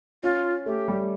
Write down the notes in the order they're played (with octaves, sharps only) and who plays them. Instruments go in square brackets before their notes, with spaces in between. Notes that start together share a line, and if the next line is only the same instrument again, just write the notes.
[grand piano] C#4 [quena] F4
[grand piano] A3 [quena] G4
[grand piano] G3